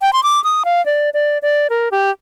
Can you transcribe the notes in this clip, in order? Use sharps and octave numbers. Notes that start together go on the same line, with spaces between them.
G5
C6
D6
D#6
F5
D5
D5
D5
A#4
G4